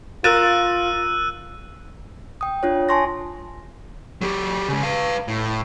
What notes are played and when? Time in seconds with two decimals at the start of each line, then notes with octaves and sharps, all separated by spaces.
0.24 F4 A#4 E6 F#6 A6 D#7 E7
2.41 G5 D#6
2.63 D4 F4 C#5
2.89 G#5 A5 C6 C#6 A#6
4.21 F#3 G4
4.69 C#3 G#3
4.83 B4 F5
5.28 A2